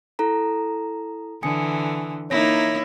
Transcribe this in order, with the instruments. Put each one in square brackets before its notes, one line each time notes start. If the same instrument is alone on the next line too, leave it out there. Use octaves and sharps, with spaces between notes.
[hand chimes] E4 A4 A#5
[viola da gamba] D3 E3 [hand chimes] G#5 D#6 C#7
[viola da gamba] A#3 D#4 E4 [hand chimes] C#5 A#6